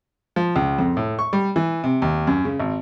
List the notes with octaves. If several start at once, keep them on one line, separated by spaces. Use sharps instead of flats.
F3
C#2
F2
A2
C#6
G3
E3
C3
D#2
F#2
C#3
G#1